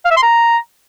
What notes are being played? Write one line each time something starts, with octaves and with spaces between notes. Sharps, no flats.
F5
E5
C6
A#5